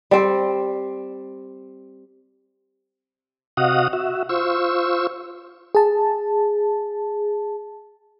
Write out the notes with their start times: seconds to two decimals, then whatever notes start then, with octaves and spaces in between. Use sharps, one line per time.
0.11 G3 C4
3.57 C3 F#4 D#5 F5 F#5 D#6
3.93 F#4 E5
4.29 F4 C5 C#6 E6
5.75 G#4 A5